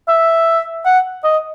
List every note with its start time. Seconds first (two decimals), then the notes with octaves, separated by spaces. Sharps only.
0.08 E5
0.85 F#5
1.24 D#5